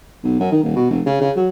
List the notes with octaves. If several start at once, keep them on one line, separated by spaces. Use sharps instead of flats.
B1
F#2
D#3
D#1
B2
F1
C#3
C#3
F#3